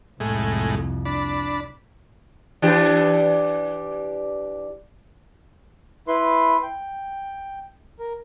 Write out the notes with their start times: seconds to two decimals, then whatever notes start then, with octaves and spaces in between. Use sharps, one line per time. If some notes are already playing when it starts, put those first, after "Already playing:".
0.20 C2 F2 A2 G#3
1.06 D4 B5
2.62 E3 D4 G4
6.08 E4 B4 C6
6.63 G5
7.99 A#4